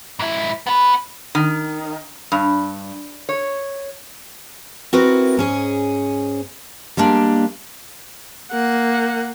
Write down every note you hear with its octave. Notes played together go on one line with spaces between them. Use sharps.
G#2 E4
B3 B4
D#3
G2
C#5
C4 E4 F#4 A#4 B4
G#2 C#4 G#4
G3 G#3 A#3 D4
A#3 F#5